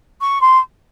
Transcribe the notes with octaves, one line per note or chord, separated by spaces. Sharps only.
C#6
C6